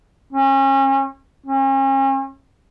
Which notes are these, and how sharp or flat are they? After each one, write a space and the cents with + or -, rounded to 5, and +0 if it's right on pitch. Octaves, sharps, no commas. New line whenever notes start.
C#4 -35
C#4 -40